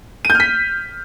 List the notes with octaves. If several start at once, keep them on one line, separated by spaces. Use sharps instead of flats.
D#7
G6
F6
B6